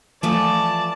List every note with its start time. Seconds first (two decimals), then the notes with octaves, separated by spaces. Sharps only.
0.23 E3 F3 A3 D5 A5